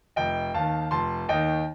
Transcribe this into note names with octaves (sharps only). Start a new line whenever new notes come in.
F1 D#5 G5
D#2 D#3 F5 A5
F1 A5 C6
D#2 D#3 D#5 G5